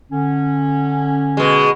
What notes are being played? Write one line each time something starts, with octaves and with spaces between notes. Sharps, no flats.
D3 C#4
B2 G#3